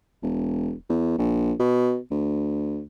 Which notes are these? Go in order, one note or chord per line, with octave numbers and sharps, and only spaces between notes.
E1
E2
A#1
B2
D2